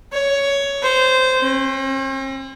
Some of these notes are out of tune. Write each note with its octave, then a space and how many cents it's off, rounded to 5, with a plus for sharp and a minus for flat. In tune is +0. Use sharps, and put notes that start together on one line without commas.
C#5 +10
C5 -15
C4 +45